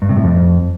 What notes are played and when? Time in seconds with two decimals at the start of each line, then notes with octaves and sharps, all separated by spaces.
0.02 G2
0.09 C3
0.17 A2
0.24 F2